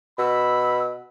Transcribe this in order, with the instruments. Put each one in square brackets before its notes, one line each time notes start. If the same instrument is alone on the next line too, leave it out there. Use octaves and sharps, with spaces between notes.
[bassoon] B2 [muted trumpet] B5 [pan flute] E6